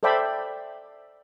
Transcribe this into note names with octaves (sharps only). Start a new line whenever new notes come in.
A4 C5 D5 E5 G5 B5